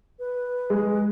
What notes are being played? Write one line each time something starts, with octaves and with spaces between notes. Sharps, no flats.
B4
G#3